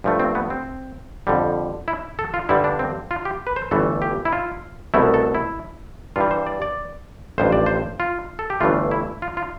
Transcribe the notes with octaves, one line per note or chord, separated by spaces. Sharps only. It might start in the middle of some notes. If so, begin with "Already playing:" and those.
G2 F3 A3
C4
B3
C4
F2 D3 G3
E4
A4
F4
G2 D3 G3 E4
D4
C4
F4
G4
B4
C5
G1 G2 E3 A3 A4
G4
E4
F4
C2 B2 A3 E4
A4
E4
G2 E3 G3 F4
C5
D5
D5
A1 G2 F3 C5
D5
C5
F4
A4
G4
G1 G2 E3 A3 F4
E4
F4
F4